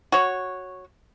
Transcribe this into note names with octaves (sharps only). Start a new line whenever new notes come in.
F#4 C#5